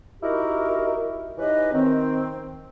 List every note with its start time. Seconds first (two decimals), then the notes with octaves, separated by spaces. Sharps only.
0.22 D#4 E4 F#4 G4 A#4
1.38 E3 C#4 D#4 G4 B4 D#5
1.74 D#3 C4